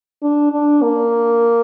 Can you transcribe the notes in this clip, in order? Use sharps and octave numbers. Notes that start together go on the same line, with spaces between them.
D4
D4
A#3